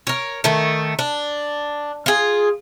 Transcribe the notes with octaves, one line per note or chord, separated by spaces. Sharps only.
A#4 C#5
D#3 A3
D4
F4 G#4